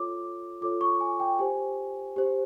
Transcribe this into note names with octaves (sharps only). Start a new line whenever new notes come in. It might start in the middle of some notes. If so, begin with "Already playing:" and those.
Already playing: F4 A4 C#5 D6
F4 A4 C#5 D6
C#6
G#5
G5
G4 C5 G#5
G4 C5